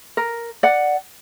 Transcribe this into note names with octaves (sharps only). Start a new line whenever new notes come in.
A#4
D5 F#5